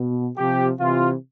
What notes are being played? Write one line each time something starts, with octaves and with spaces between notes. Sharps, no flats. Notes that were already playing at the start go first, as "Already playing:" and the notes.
Already playing: B2
C3 F3 G4
C3 E3 F4